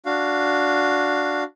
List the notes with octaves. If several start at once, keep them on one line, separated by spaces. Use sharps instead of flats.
D4 F#4 F5